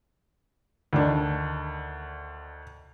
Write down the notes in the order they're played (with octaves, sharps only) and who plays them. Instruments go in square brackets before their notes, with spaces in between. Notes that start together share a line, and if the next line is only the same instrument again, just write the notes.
[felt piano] D2 D#3 D4